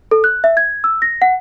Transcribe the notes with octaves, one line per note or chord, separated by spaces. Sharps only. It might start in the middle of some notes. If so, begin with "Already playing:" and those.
A4
F#6
E5
G#6
E6
A#6
F#5